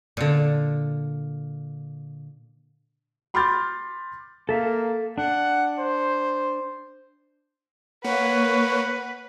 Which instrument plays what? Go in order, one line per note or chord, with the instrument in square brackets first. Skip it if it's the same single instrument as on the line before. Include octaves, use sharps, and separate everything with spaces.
[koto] A#2 D3
[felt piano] B5 C6 D6 F6 G6 A6
[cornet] A#3 [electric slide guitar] A4 E5 F5
[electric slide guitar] D4 [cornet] F#5
[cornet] C5
[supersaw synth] A#3 [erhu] B4 [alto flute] C#5 [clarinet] F#5